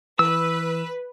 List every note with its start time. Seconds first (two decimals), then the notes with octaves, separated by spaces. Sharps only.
0.19 E3 B4 E6